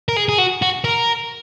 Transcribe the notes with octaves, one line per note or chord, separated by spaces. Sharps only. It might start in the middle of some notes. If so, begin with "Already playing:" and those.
A#4
G#4
G#4
F#4
F#4
A#4